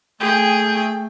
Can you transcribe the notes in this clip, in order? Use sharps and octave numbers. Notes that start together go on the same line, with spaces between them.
A3 G#4 G5